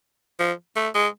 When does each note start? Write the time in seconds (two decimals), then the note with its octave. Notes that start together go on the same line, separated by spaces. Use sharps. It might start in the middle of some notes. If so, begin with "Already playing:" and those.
0.40 F3
0.76 A3
0.94 G#3